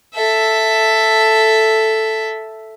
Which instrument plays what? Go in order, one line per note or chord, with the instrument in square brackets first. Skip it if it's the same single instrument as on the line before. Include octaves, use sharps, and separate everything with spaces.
[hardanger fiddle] A4 E5